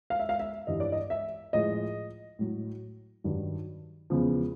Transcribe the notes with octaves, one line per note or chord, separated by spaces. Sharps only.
F5
E5
F5
E5
G2 E3 G3 D#5
D5
D#5
E5
A2 F3 G#3 D#5
A2 F#3
G2 D#3 F#3
E2 C#3 F3 G#3